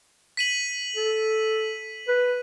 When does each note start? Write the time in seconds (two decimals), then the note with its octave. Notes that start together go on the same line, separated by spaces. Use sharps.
0.37 B6 D#7 F#7
0.96 A4
2.08 B4